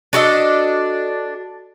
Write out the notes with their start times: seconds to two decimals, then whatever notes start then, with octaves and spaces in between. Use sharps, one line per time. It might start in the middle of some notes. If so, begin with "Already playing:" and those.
0.13 D4 F#4 A4 D#5